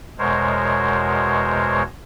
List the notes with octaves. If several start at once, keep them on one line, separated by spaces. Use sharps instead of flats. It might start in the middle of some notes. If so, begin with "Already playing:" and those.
E2 B2 G#3 A#4 C5 C#5